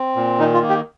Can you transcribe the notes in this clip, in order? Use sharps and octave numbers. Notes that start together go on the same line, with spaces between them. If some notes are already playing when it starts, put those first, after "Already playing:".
Already playing: C4
A#2
D#3 D#4
F4
A#3
G4